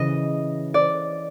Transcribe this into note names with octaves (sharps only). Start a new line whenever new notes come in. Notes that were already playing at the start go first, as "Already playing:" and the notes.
Already playing: C#3 E3 D#5
D5